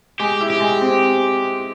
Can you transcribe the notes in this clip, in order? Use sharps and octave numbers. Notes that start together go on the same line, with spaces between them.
G#3 G4
E4
G4
G#3
C4